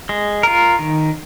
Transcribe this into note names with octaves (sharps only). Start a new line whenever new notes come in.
G#3
F4 A#4
D#3